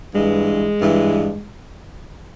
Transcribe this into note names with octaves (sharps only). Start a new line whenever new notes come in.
G2 E3 G#3
G2 E3